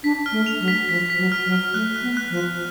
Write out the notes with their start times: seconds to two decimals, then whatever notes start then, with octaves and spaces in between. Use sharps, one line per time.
0.04 D4 B6
0.26 F6
0.32 A3
0.46 F7
0.60 F#3
0.68 B6
0.89 F3 B6
1.10 B6
1.18 F#3
1.32 F6
1.46 F#3
1.52 F6
1.74 A3 F#6
1.96 F#6
2.02 B3
2.17 F#6
2.30 F3
2.38 F#6